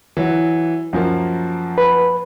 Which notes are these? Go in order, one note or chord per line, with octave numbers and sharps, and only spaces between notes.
E3 F#3
F#2 F3 A#3
B4